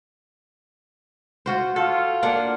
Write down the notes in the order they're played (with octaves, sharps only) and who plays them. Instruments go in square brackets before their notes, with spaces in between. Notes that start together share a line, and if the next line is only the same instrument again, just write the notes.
[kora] F4 F#4 C5
[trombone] F4 [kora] A4
[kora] A#3 D4 F#5